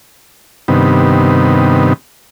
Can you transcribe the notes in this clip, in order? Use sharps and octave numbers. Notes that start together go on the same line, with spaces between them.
G2 C3 D#3 B3